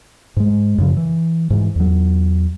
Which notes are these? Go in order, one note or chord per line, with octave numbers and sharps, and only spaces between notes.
G#2 G#3
F#2 C#3 F3
E3
G#2 E3
E2 F#3